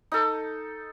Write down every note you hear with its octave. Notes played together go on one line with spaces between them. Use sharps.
D#4 A4